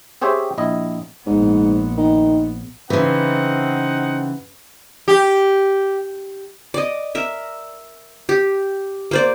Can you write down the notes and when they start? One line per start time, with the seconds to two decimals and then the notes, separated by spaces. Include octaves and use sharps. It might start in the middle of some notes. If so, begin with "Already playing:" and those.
0.22 C4 G4 G#4 C5 C#5 E5
0.58 A#1 E4 D#5
1.26 A#1 G#2 B3
1.98 D#3
2.90 C#3 E3 C4 D#4 B4 F#5
5.08 G4
6.74 D5 D#5
7.15 A#4 E5
8.29 G4
9.11 A#3 C5 D5